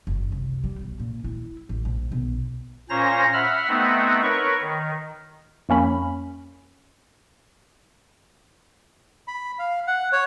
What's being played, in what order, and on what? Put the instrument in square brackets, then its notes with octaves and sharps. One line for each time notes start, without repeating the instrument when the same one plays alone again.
[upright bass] F#1
C2
G3
B1
A#2
E4
A1
A#1
B1
[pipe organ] A#2 C#4 C5 C#5 A#5 A#6
E5 F#5 B5 F6
A3 B3 C4 D#4 E5 F#5
A#4 B4 C#5 C#6
D#3
[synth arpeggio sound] F2 A#3 C#4 B5
[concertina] B5
F5
F#5
C#5